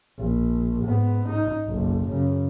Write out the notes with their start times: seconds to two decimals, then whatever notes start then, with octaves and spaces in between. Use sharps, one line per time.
0.18 A#1
0.85 G#2 B3
1.29 D#4
1.65 F#1 B1
2.10 F#2 C#3